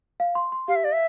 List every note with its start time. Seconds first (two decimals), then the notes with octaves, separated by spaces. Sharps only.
0.20 F5
0.35 C6
0.52 C6
0.68 G4 F5
0.76 E5
0.84 D5 F5
0.93 E5